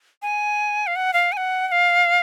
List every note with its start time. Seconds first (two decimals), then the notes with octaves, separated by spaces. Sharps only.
0.22 G#5
0.87 F5
0.96 F#5
1.14 F5
1.32 G#5
1.37 F#5
1.68 F#5
1.72 F5